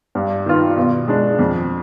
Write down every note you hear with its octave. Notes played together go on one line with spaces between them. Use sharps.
G2
D#3 B3 F4
B2
G#3 D4
F2